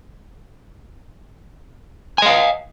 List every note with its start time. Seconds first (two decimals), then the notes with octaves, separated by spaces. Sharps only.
2.18 G#5
2.22 D#5
2.26 F5